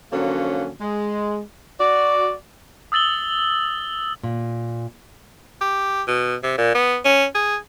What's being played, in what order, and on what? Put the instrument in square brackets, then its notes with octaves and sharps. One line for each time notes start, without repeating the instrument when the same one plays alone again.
[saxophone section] D3 F3 F#3 A#3 C#4
G#3
F#4 D5
[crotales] D#6 E6 A6 F#7 G7
[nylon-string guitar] A#2
[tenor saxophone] G4
B2
C3
A#2
B3
C#4
G#4